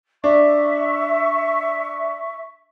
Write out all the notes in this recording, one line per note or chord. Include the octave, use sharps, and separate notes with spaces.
D4 E5 C#6